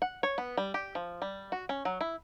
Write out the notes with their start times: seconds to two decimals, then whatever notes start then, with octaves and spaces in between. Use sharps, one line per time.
0.02 F#5
0.23 C#5
0.38 B3
0.57 G3
0.74 G4
0.95 F3
1.22 G3
1.52 F#4
1.69 C#4
1.85 F#3
2.01 E4